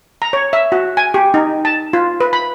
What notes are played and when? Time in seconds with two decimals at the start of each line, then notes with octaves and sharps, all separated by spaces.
0.22 A#5
0.33 C#5
0.53 E5
0.72 F#4
0.97 G#5
1.14 G4
1.34 D#4
1.65 A5
1.93 F4
2.20 B4
2.33 B5